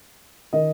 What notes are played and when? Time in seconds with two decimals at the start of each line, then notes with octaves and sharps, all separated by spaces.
0.53 D#3 D#5